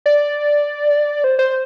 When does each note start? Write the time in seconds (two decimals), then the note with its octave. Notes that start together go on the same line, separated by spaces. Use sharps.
0.06 D5
1.24 C5
1.39 C5